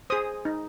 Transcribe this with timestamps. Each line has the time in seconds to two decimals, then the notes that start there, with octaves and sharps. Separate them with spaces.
0.10 G#4 C5 D#6
0.45 D#4